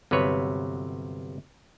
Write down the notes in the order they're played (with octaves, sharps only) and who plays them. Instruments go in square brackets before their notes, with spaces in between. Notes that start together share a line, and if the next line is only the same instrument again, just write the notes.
[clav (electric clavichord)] G1 C3 F#3 B4 C#5